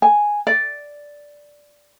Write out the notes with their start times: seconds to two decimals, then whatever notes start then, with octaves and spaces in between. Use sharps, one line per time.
0.02 G#5
0.47 D5